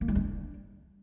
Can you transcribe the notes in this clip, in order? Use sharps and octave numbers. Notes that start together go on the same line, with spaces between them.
A#3
G3
D4